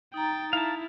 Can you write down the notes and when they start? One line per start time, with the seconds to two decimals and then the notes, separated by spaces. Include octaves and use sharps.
0.14 D#4 G5 A#5 A6
0.53 E4 F5 A5